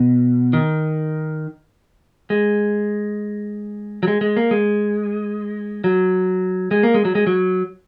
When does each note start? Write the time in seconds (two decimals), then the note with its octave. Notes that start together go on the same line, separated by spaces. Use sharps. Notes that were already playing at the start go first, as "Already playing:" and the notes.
Already playing: B2
0.53 D#3
2.30 G#3
4.03 F#3
4.08 G#3
4.21 G#3
4.36 A#3
4.51 G#3
5.84 F#3
6.71 G#3
6.83 A#3
6.94 G#3
7.05 F#3
7.15 G#3
7.27 F#3